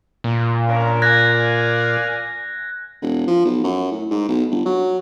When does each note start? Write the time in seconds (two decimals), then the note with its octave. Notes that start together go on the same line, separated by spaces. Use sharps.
0.24 A#2
0.68 C#4 D4 A#4
1.02 D5 F5 G#5 F#6 G#6 A#6
3.02 E1
3.27 F3
3.45 B1
3.64 F#2
3.92 A2
4.11 G#2
4.28 B1
4.51 G1
4.66 F#3